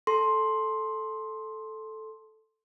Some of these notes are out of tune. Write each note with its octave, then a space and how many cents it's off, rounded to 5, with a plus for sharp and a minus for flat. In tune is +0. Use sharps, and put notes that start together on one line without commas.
A4 -5 C6 +10